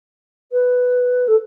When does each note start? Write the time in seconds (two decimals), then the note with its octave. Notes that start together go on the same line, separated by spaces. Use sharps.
0.52 B4
1.27 A4